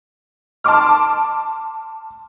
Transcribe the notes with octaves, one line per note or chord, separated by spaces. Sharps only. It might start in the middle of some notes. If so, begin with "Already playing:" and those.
A5 C6 D6 F6